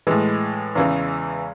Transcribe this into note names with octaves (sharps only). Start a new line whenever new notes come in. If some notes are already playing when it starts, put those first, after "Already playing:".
A2 E3 G#3
E2 C#3 E3